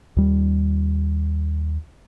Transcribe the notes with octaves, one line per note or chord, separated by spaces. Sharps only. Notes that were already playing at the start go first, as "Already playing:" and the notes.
D#2 G3